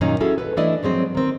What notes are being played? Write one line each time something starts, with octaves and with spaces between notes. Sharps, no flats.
F#2 A#2 D#3 C#4 D#4
C#4 E4 F#4 G#4 A4
A4 B4
E3 A3 D4 E4 D5 D#5
F3 F#3 G#3 C4
D#3 C4